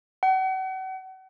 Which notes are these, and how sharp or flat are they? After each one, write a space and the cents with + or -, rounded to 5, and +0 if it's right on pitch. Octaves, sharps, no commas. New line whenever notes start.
F#5 +40